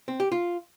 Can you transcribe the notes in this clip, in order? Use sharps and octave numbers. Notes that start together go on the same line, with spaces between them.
C4
G4
F4